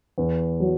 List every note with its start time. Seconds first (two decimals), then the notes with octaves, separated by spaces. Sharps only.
0.18 E2
0.60 F#3